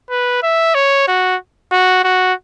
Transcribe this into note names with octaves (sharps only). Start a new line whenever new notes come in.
B4
E5
C#5
F#4
F#4
F#4